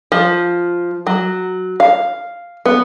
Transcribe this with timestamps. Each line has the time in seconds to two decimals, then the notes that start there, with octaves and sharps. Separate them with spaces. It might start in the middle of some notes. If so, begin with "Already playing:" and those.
0.12 F3
1.07 F#3
1.80 F5
2.66 B3